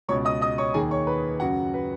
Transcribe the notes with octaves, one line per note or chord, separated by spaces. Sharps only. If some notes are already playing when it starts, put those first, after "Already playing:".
C#2 B2 C#5 C#6
D#5 D#6
D#5 D#6
C#5 C#6
D#2 D#3 G#4 G#5
C#5 C#6
B4 B5
F#2 C#3 F#4 F#5
B4